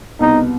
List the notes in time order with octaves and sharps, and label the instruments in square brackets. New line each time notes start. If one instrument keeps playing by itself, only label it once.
[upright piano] C2 B2 B3 [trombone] D#4